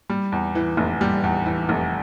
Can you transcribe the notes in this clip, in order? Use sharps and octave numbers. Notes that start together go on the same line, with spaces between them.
G3
E2
E3
F1
G3
E2
E3
F1